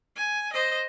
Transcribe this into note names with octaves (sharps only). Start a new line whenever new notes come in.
G#5
C5 D#5